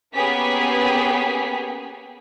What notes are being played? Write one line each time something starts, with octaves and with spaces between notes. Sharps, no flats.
A#3 B3 C#4 G4 G#4 B6